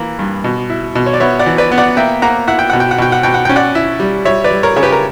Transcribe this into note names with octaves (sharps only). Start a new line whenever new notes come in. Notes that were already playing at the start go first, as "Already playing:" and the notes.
Already playing: E3 A#3
G2
B2
E4
B2
C#5
D5
B3 C#5 E5
D5 F#5
E3
B4 D5
B3
D5 F#5
A#3 E5 G5
A#3 F#5 A#5
E4 F#5
G5
B2 F#5
G5
F#5
B2 G5
F#5
B2 G5
F#5
C#4 G5
D5 F#5
E4
G3
G3 C#5 E5
B4 D5
G3
A#4 C#5
C#3 C#5
G4 B4
A#4